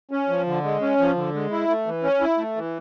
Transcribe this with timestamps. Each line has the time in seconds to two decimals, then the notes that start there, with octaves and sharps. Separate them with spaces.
0.11 C#4
0.29 F3
0.47 D3
0.63 G#3
0.81 C#4
0.99 F3
1.16 D3
1.34 G#3
1.51 E4
1.68 A3
1.86 E3
2.03 C#4
2.21 E4
2.38 A3
2.56 E3